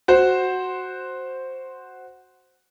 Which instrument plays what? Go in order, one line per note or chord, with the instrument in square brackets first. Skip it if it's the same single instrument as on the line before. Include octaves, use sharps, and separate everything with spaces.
[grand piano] F#4 C5